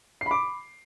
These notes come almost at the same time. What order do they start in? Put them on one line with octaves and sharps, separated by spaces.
C7 B5 D6